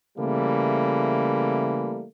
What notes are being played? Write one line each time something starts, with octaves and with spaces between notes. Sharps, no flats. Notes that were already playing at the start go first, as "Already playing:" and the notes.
C#3 E3 G3 A3 A#3